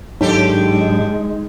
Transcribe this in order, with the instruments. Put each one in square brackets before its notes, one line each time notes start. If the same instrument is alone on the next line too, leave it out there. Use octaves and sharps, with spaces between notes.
[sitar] D#2 G4 A4 [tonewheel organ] G#2 F#3 D4 [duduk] G#3 [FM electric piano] D#4